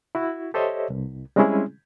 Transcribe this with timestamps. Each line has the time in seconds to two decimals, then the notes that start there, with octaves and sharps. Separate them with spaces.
0.15 E4 F#4
0.54 G4 A4 C5 C#5 D#5 E5
0.90 C2
1.36 G3 G#3 C4 C#4 E4 G#4